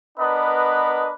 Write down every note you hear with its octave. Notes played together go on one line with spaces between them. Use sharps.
B3 D4 A#4 B4 D#5